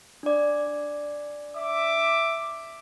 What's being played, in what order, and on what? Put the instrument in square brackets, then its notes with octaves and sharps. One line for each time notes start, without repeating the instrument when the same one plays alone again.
[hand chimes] D4 D5
[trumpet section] E5 D6